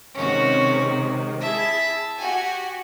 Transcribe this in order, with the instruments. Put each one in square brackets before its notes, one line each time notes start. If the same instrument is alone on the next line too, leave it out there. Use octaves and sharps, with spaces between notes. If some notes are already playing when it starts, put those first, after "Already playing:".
[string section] C3 D#3 G#3 [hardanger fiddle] C#4 F#4
[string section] E4 G#4 [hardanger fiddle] E5 A5
[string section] F#4 G4 [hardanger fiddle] G#5